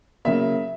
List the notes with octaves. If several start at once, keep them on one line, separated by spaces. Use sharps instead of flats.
C#3 F#3 A#3 E5